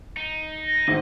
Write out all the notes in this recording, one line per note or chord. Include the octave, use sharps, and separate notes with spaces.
D#4
A#6
G#1 G#2 D#5